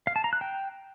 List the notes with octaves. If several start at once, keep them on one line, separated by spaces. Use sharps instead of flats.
F5
A5
A#5
F#6
G5